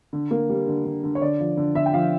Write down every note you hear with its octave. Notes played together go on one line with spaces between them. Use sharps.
D3
A#3
G3
D3
D3
D3
C#5
D3 D5
F3
D3
D3 E5
G5
F3 F5